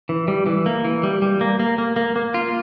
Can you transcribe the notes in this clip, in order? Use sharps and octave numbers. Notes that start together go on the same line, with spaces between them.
E3
G3
E3
A#3
E3
G3
G3
A#3
A#3
A#3
A#3
A#3
F4